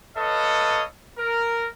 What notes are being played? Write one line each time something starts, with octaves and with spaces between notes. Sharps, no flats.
A4 B4 C#5 D#5 F5
A#4